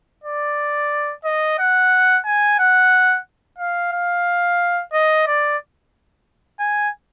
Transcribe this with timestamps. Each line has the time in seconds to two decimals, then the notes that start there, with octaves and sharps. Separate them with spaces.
0.24 D5
1.25 D#5
1.59 F#5
2.25 G#5
2.59 F#5
3.58 F5
3.92 F5
4.93 D#5
5.27 D5
6.59 G#5